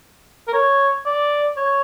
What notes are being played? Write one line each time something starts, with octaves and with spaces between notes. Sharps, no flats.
A#4
C#5
D5
C#5